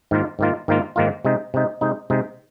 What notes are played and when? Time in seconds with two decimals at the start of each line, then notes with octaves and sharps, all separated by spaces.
0.11 G#2 D#3 A#3 F4
0.39 G#2 D#3 A#3 F4
0.68 G#2 D#3 A#3 F4
0.96 G#2 D#3 A#3 F4
1.25 C3 G#3 D#4
1.54 C3 G#3 D#4
1.81 C3 G#3 D#4
2.10 C3 G#3 D#4